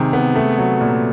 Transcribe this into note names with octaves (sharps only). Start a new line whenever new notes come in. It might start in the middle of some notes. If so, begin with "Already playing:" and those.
Already playing: C3 D#3 G#3 G#4
B3
A3
F#3
A#2